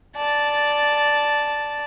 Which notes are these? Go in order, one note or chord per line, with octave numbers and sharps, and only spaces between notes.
D5 A5